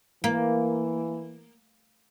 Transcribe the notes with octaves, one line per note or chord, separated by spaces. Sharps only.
E3 A#3